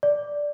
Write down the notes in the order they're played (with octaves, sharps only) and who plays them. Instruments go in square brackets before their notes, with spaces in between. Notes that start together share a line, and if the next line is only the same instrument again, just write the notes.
[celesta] D5